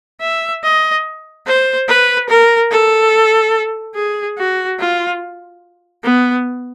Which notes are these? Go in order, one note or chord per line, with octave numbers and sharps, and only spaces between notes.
E5
D#5
C5
B4
A#4
A4
G#4
F#4
F4
B3